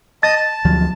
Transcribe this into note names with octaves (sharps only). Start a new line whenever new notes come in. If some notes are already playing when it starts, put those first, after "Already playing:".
D#5 A5 D#6 A6
A5
D2 F3 F#3